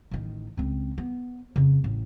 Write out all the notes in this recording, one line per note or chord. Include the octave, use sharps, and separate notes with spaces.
A1 D#3
C#2 C4
B3
F2 C#3
A1